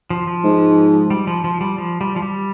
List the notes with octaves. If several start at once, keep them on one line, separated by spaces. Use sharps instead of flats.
F3
F3
G#2
G3
F3
F3
G3
F3
G3
F3
G3